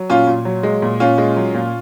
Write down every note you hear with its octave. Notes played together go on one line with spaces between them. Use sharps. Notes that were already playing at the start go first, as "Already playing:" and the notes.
Already playing: F#3
A#2 C#4 F4
A#2
F#3
G#3
A#2
A#2 C#4 F4
G#3
F#3
A#2